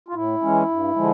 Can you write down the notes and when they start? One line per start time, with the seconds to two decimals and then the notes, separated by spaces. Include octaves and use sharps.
0.09 F4
0.14 A2 E4
0.42 E3 G#3 C#4
0.69 G2
0.96 D3 F3 G#3